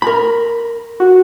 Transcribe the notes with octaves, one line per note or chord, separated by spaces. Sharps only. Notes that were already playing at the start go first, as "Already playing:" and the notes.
A#4 B5
F#4